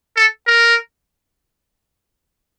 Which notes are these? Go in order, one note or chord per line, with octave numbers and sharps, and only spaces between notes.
A4
A#4